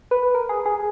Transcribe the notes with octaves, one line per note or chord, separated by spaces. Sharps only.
B4
A#4
G#4
G#4